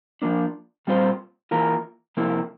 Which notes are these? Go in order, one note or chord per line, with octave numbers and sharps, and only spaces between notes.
F3 A#3 D4
A#2 G3 C4 F4 C5
E3 A#3 F4 A#4
C3 F3 A#3 E4